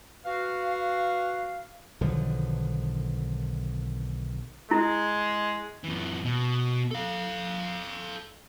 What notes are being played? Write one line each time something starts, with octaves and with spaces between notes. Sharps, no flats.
F#4 B4 F5
B1 D3 D#3 F3
G#3 E4
F#2 E3
B2
A4 F5